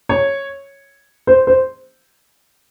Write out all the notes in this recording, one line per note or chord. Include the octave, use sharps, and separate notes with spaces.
C#5
C5
C5